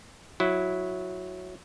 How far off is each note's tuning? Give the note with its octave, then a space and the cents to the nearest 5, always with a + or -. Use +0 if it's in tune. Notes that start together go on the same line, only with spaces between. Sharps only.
F#3 -10 E4 +0